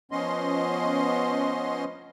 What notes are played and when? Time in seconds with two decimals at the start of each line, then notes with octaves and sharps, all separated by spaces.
0.11 F3 B3 C#4 D#5 C6